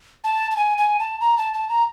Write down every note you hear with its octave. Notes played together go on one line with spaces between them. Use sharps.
A5
A5
G#5
G#5
A5
A#5
A5
A5
A#5